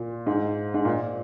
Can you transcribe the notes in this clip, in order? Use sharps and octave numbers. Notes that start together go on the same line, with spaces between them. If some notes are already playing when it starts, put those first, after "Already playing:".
Already playing: A#2
G#2
G#2
A#2